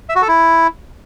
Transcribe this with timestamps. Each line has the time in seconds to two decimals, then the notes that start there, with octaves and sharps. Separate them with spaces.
0.09 E5
0.15 F#4
0.22 A4
0.28 E4